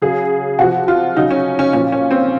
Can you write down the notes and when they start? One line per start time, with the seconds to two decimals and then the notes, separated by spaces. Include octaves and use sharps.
0.02 C#3 F#3 G#4
0.59 C3 F3 F#4
0.88 F4
1.16 C#3 F#3 D#4
1.31 C#4
1.59 C#4
1.73 A#2 F3 C#4
1.92 C#4
2.11 C4